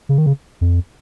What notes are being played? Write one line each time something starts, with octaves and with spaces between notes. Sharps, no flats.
C#3
D#3
C#3
F2